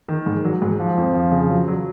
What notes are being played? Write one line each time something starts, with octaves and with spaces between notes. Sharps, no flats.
D#3
G#2
F#3
G#2
F3
F2
F3
C#3
F#3
F#3